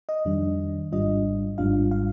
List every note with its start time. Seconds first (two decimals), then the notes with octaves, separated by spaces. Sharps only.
0.09 D#5
0.25 F2 D#3 G3 D4
0.92 G#1 G#2 G3 D4 F4 D#5
1.58 G#1 G#2 G3 D4 F4 F5
1.91 F5